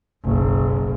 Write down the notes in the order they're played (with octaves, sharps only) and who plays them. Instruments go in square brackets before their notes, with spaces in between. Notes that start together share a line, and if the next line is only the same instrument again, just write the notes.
[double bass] F#1 B1